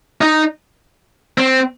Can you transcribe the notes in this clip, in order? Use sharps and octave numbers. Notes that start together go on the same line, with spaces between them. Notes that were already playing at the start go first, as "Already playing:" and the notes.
D#4
C4